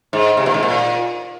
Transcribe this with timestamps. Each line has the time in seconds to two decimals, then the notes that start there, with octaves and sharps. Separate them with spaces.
0.13 G#2
0.37 C3
0.46 A#2
0.54 G#2
0.63 A#2